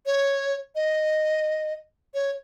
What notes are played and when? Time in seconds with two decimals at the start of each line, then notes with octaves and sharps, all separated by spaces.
0.06 C#5
0.75 D#5
2.14 C#5